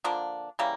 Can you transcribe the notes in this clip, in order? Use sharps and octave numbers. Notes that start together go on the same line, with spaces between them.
D3 F3 A#3 D4
C#3 E3 G3 A#3